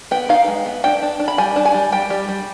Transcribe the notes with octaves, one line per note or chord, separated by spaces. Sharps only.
B3 G5
D#4 F5
G#3
B3
D4 G5
D4
D4
B5
G3 G#5
D4
G#5
G3
G3 G5
G3
G3